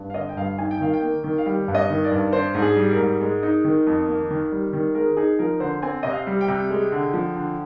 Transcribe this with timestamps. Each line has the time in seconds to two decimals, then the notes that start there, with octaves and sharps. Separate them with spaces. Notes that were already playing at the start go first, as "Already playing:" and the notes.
Already playing: G2
0.10 F5
0.14 D3 D#5
0.29 G5
0.37 G2 F5
0.58 D#4 G#5
0.71 G5
0.81 D#3 F5
0.94 G5
1.02 A#3
1.24 D#3
1.38 F5
1.46 G3 G5
1.68 G2
1.75 D#5
1.90 D#3
2.04 D5
2.11 G2
2.33 D4 C5
2.54 G#2
2.62 G#4
2.76 G3
2.91 A#4
2.98 G#2
3.21 G#3
3.43 D#4
3.64 D#3
3.87 F2
4.07 A#3
4.30 D#3
4.52 G3
4.73 D#3
4.95 G#3 A#4
5.17 D#4 G#4
5.39 F3 A#4
5.60 D3 C5
5.82 C4 G#5
6.03 C3 D#5
6.12 F5
6.27 G3
6.41 G5
6.48 C3
6.70 G#3
6.92 D3
7.13 F3
7.36 D3